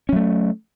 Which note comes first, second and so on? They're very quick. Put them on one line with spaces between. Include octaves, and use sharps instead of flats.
C#4 F#3 A3